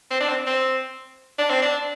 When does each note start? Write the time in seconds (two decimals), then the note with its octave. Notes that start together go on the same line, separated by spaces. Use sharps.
0.11 C4
0.21 D4
0.29 C4
0.47 C4
1.39 D4
1.50 C4
1.62 D4